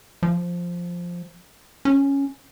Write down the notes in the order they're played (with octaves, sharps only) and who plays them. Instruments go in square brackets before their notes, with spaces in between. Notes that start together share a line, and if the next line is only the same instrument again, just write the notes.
[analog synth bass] F3
C#4